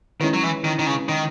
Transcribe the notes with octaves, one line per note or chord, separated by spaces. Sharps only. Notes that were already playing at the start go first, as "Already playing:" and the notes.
D#3 G#3 C#4 E4 B4
F#3
E3
D#3
D#3
C#3
D#3